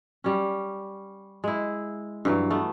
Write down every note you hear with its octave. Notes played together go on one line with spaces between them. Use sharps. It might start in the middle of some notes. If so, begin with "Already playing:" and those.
G3 C#4
G#3 E4
G2 E3 F#3
A3 B3